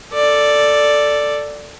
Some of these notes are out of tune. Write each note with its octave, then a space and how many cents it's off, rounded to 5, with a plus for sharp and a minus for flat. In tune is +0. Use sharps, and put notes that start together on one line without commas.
A4 +10 D5 +0